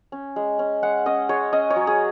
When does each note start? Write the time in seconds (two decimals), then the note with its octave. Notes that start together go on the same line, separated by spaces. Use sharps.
0.12 C#4
0.36 G#3
0.59 C#4
0.83 G#3 F#5
1.06 C#4 D#5
1.29 G#3 C#5
1.53 C#4 D#5
1.70 C#5
1.76 F#3
1.87 G#4